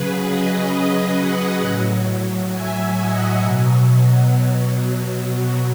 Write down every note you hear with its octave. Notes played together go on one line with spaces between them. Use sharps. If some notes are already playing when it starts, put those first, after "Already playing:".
Already playing: C#3 F#3 G#4 B4
B4 D#5
D#5 F#5
A2 F#3
E5 G#5
D#5 F#5
B2 F#3